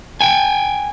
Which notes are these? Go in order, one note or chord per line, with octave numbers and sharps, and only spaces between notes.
G5 G#5